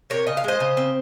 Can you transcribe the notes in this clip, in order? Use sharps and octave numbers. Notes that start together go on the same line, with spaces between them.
C3 A#4 C#5
C#3 D#5
F5
G#3 C5 D#5
C#3
C4